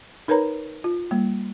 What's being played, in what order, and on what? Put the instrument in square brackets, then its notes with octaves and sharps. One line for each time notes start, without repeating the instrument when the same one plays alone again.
[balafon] D#4 A#4 B4 C#5 A#5
F4
G3 A#3